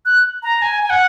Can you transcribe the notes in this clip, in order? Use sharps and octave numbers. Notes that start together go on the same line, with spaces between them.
F#6
A#5
G#5
G#5
F#5